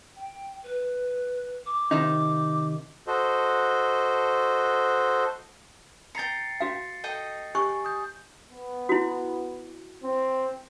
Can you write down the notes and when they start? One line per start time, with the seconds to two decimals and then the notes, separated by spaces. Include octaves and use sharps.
0.16 G5
0.64 B4
1.66 D6
1.91 C3 D#3 D#4
3.07 F#4 A4 C5 D#5
6.15 G5 A#5 A6 C7 C#7
6.60 F#4 F5
7.04 A4 D#5 G5
7.55 G4 G#5 C#6
7.85 D#6 G6
8.50 B3
8.89 E4 F#4
10.03 C4